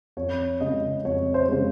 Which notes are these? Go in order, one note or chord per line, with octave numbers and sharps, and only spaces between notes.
F2 C#5
C#3 G#3 D#5
F2 C#5
C5
C#3 G#3